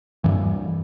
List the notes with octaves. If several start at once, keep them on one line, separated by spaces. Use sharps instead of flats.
G2 E3